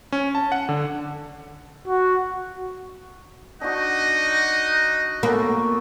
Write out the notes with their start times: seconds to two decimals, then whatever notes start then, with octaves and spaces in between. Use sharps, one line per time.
0.12 C#4
0.35 A5
0.52 F#5
0.69 D3
1.88 F#4
3.61 D4 D#4 F#4 D#5 F#5
5.23 A#3 B3 C#4 A4